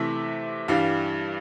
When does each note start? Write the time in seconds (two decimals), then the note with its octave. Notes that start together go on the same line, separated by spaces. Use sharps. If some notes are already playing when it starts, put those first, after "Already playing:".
Already playing: C3 E3 A3 E5
0.68 G2 E3 G3 D4 F5